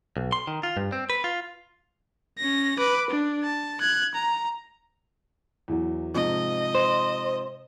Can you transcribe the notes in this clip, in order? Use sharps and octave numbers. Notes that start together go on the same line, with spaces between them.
B1
C6
D#3
F4
G2
C4
B4
F4
C#4 A#6
B4 D6
D4
A5
F#6 G#6
A#5
E2 E3 F#3
G#2 C3 F3 D#5
C5